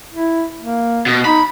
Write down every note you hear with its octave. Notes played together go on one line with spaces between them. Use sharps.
E4
A#3
B2
D#4 B5